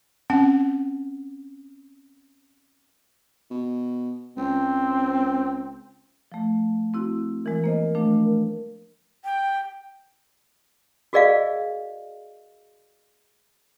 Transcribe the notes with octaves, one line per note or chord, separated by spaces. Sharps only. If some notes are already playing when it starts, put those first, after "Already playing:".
C4 C#4 F#5
B2
C#2 C4
F3 A3
C4 E4 F#4
E3 G#3 A#4
A#3 C5 D#5
F3 A3 D4
G5
F#4 G#4 A#4 D5 D#5 F5